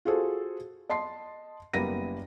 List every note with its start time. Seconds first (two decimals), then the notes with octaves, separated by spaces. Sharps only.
0.05 F4 F#4 G#4 A4 C5
0.90 D#5 A5 C6 C7
1.73 F#1 G3 A#3 B3 A#6 D#7